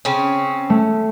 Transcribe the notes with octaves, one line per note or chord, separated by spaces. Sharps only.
C#3 C4 C#4
A3